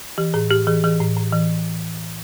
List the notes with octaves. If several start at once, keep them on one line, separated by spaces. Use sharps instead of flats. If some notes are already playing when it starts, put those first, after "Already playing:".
E3 G4
A2 G#4
A2 G4
E3 G#4
E3 G#4
A2
A2
E3